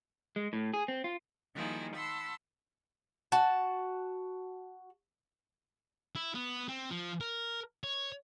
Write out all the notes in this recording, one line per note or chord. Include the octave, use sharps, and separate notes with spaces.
G#3
A2
G#4
C4
F4
D#3 F3 G3 A#3 E4 G#4
F#5 A5 B5 C6 E6
F#4 A5
E4
B3
C4
F3
A#4
C#5